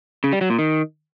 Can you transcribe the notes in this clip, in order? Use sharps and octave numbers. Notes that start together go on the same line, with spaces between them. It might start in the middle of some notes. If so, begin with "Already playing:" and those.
C#3
G3
F#3
A#2
D#3